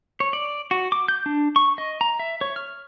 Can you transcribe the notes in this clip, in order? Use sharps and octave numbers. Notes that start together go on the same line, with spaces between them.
C#5
D5
F#4
D6
G6
D4
C#6
D#5
A#5
E5
C#5
F6